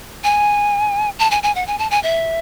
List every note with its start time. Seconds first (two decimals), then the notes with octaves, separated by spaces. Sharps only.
0.24 G#5
1.19 A5
1.31 G#5
1.43 G#5
1.55 F#5
1.67 G#5
1.79 A5
1.91 G#5
2.03 E5